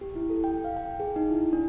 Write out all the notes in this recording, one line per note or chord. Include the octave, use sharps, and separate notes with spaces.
G4
E4
A4
G5
F5
G5
G#4
D#4
E4
D4